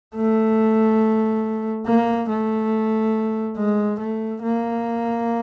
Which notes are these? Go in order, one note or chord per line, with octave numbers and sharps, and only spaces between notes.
A3
A#3
A3
G#3
A3
A#3